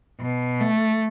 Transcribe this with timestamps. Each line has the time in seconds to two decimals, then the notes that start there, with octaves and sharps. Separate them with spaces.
0.20 B2
0.60 A3